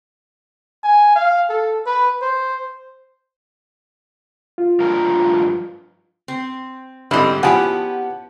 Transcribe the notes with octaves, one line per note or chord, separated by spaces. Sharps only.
G#5
F5
A4
B4
C5
F4
G2 F3 A#4
C4
G#2 D3 G3 C4 E4 D#5
F3 B3 C#4 E4 G4 G#4 F#5 A5